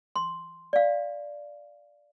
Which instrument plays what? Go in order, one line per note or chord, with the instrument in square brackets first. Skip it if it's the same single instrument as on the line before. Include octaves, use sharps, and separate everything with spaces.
[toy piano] C6
D5 F5